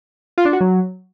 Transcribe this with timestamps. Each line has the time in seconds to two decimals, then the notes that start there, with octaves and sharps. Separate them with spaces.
0.38 F4
0.45 D4
0.53 F#4
0.61 F#3